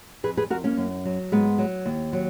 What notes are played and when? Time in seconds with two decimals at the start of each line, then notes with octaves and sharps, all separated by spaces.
0.23 F2 G#4 B4
0.37 G#4 B4
0.50 F2 F#4 A#4
0.64 A#3 C#4
0.77 F#2
1.05 F#3
1.32 G#2 G#3 B3
1.58 F#3
1.86 D#2
2.13 F#3